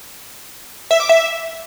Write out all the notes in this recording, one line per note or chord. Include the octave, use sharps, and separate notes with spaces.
E5
D6
E5